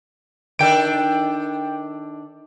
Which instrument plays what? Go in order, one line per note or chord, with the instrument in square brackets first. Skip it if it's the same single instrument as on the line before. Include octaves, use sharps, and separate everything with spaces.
[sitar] D#3 D4 A4 [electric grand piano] G5 D7